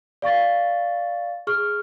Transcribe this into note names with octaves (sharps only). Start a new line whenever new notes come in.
D5 F5 C#6 A6
G#4 C#6 F6